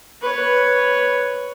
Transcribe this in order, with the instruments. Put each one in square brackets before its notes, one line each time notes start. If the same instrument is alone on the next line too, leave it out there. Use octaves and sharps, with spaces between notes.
[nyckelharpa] B4 C#5